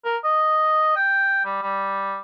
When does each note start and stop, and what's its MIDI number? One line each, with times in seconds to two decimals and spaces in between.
0.05 0.17 70
0.24 0.94 75
0.96 1.40 79
1.45 1.59 55
1.62 2.19 55